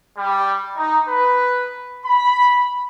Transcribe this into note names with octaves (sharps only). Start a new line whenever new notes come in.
G3
D#4
B4
B5